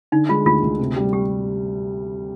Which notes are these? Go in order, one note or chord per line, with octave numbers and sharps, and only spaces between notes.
D3 D#4
G#3 F4
D2 F4
D2
C3
G3
G4